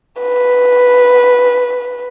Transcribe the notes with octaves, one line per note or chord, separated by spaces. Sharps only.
B4